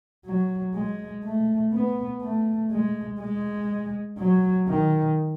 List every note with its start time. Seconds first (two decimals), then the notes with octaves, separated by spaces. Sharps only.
0.26 F#3
0.75 G#3
1.23 A3
1.73 B3
2.22 A3
2.71 G#3
3.20 G#3
4.19 F#3
4.68 D#3